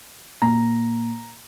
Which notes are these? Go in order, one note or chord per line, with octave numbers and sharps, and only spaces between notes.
A#2 A#5